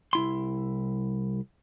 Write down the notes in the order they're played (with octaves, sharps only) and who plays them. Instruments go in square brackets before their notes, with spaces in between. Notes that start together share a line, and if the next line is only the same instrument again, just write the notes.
[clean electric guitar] C2 E4 C6